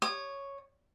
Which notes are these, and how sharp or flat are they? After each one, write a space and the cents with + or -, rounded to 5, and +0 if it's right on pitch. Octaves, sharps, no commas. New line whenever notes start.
C#5 +0 D#6 -35